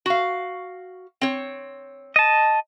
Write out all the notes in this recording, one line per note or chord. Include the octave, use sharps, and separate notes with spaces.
F#4 F5
C4 C#5
D#5 A5